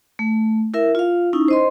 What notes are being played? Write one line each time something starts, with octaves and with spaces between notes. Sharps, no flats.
A3
E4 A#4 E5
F4 F5
C#4 D#4 E4
C5 D#5 C6